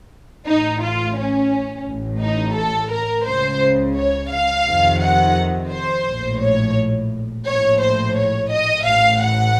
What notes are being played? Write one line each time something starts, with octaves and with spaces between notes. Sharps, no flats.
A1 A2 D#4
F4
C#4
A1 A2
D#4
A4
A#4
C#2 C#3 C5
C#5
F5
F2 C3 D#3
F#5
C5
A#1 A2
C#5
A#1 A2 C#5
C5
C#5
D#5
A1 A2 F5
F#5